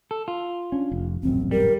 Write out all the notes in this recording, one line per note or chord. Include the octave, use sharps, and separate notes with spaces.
A4
F4
C#4 D4
F1
D#1 A1 F#2 C4
G3 A#4